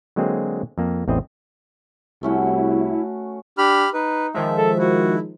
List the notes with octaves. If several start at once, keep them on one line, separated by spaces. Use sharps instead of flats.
D3 F#3 G#3 A#3 C4 G#4
F2 A#3
A1 E2 C4 E4 D#5
C2 A3 C#4 E4 F#4
D4 G4 B5 F6
D#4 B4
D#3 F3 G#3 E5
A4
E4 F#4